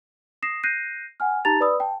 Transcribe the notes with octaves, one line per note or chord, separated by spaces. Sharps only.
D#6 A#6 C7 E7
F#6 G6 A#6 C7 D#7
F#5 G#5 F6
D#4 G4 A5 A#5 A6 F7
B4 D5 B5 D#6 E6
G5 A5